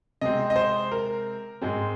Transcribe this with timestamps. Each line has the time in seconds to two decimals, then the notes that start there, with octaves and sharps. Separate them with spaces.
0.21 C3 G#3 C4 D#5
0.50 D#5
0.56 C5
0.91 A#4
1.62 G#2 G#3 C4